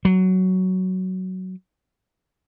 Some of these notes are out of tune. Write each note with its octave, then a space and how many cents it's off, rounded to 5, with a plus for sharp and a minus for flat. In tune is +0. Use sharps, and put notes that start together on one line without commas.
F#3 +10